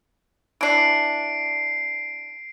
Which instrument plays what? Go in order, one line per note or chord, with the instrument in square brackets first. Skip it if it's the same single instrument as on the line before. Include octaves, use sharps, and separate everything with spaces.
[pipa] E3 D4 [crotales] C7 D7